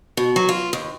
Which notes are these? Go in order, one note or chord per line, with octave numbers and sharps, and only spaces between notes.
B2
F#3
F4
D#2